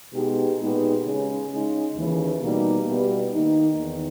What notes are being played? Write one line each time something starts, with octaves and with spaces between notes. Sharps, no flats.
B2 G#3 D#4 G4
A#2 G#3 B3 D#4 G4
C#3 G#3 C#4
C#3 G#3 D#4
D#2 C#3 E3
B2 G3 A#3 D#4
B2 G3 B3 E4 G4
D#3 A#3 D#4
E2 D#3